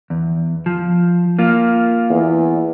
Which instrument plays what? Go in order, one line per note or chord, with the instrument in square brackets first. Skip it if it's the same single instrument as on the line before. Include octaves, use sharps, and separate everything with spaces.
[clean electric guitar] E2
F3
A#3 F4
[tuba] E2